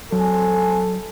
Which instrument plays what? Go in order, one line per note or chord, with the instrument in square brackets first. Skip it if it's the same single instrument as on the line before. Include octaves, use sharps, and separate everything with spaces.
[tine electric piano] F#3 [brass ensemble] C4 G#5 [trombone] A4